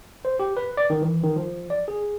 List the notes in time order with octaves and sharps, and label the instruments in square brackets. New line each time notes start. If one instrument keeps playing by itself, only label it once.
[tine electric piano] C5
G4
B4
D5
D#3
E3
D#3
F3
D5
G#4